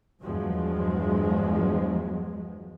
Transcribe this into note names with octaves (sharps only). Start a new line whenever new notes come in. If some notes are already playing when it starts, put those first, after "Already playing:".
E2 G2 F3 F#3 G#3